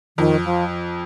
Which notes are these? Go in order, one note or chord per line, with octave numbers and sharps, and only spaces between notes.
F2 D#3
F3